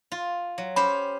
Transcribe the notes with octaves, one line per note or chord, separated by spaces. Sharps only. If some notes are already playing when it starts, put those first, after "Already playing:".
F4
F#3
C#4 G4 C5 B5